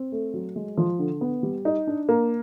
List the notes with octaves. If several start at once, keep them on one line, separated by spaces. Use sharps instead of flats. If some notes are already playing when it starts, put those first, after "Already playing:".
Already playing: C4
A3
F#3
G#3
F3
D3
B3
G3
D#4
D4
A#3